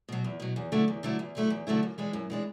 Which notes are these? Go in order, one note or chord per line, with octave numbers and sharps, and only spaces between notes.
B2 F#3
E2
B2 F#3
E2
D3 F#3 A3 E4
E2
D3 F#3 A3 E4
E2
D3 F#3 A3 E4
E2
D3 F#3 A3 E4
F#2
E3 G#3 D4
F#2
E3 G#3 D4